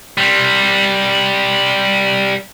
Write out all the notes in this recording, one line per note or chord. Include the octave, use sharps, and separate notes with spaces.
G3 C4